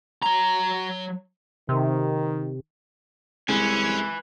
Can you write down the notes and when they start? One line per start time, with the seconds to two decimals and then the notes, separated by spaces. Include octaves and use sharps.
0.22 F#3 A#5
1.69 C3 D#3
3.49 C2 G#3 C#4 B4 G#5